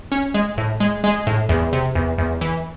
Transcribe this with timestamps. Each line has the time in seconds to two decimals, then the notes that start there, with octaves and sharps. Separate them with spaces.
0.12 C#4
0.34 G#3
0.58 A2
0.80 G#3
1.04 G#3
1.27 A2
1.49 E2
1.73 C3
1.95 E2
2.18 E2
2.41 E3